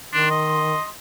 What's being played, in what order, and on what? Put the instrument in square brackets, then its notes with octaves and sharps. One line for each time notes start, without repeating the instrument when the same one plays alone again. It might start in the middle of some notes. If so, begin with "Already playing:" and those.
[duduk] D#3 [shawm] D4 [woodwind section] C6
[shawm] D#5